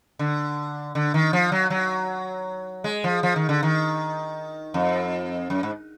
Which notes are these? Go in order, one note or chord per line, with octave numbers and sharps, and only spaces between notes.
D3
D3
D#3
F3
F#3
F#3
G#3
F3
F3
D#3
D3
D#3
F2
F#2
G#2